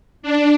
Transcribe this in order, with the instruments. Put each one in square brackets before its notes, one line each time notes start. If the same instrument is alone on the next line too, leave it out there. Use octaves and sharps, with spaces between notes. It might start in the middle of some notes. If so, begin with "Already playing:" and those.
[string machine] D4